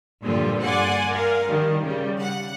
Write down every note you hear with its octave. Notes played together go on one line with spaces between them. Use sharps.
G2 A#2 D3 F3 G3 F4
D5 F#5 G#5 C6 D6
A#4 F5
D#3 G3
C#3 G3
F#5